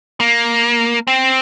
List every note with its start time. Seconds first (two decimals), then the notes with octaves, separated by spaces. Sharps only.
0.20 A#3
1.07 C4